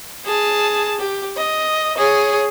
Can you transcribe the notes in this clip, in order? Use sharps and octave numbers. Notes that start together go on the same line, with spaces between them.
G#4 A5
G4
D#5
G#4 C#5